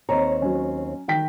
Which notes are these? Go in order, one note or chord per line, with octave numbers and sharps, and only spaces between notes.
D#2 C4 C#5 A#5
F#3 C#4
D#3 G5 B6